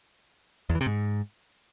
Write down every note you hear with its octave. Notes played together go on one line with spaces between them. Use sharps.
E2
E3
C3
G#2